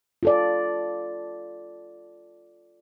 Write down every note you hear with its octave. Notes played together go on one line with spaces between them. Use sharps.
F4 A4 D5